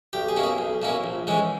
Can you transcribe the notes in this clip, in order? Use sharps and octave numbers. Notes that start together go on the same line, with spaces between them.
B1 G4
G#4
B2 A#3 C#4 E4
G#4
B1
B2 A#3 C#4 E4
A#1
G#2 E3 G#3 C#4